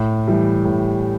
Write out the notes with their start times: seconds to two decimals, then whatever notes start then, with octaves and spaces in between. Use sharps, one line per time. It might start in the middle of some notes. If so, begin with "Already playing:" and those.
Already playing: A2
0.28 E3 G3
0.65 A2